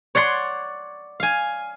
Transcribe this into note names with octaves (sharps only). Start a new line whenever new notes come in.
C#5 D5 F#5 C6
F5 G#5